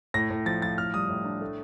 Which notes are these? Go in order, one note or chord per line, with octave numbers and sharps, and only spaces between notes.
A2 A#6
A2
F3 A6
F3 A6
A2 F6
G3 D#6
A2
D4
A3